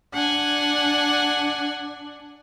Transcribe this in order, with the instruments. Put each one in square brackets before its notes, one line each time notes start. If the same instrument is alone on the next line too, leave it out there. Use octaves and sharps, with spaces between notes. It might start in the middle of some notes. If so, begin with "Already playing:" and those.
[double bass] D4 [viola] F#5 G#5